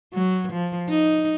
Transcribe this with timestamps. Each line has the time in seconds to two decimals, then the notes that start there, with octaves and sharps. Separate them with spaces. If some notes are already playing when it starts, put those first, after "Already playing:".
0.13 F#3
0.52 F3
0.89 D#4